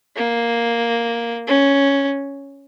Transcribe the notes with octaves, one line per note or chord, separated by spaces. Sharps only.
A#3
C#4